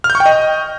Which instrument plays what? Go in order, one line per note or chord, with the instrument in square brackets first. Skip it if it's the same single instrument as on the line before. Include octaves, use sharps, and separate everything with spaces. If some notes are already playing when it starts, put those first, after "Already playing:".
[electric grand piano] F6
G6
C#6
G5
D#5